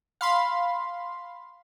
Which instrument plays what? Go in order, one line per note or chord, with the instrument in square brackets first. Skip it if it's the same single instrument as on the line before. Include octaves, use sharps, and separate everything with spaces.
[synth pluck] F5 B5 C6